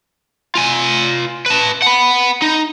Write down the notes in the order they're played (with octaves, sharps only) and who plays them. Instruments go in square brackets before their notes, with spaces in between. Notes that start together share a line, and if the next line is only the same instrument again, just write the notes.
[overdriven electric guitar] F4 G#5
B4 A5
F#5 B5
D#4